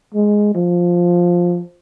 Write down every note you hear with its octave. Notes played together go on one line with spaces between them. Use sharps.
G#3
F3